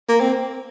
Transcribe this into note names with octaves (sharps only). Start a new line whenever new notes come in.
A#3
C4